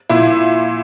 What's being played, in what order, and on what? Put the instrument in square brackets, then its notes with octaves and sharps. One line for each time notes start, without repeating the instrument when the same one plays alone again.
[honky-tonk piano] A#2 E4